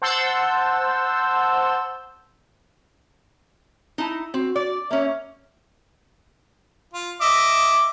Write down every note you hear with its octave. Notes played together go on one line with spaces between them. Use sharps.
C5 F#5 A5 C6 E6 G6
D#4 E4
C4 F#4
D5
A#3 C#4 E5
F4
D#5 E5 D6